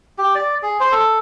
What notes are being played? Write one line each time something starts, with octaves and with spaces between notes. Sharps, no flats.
G4
D5
G#4
C5
A4